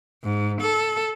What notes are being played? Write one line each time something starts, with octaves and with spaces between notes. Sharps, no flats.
G#2
A4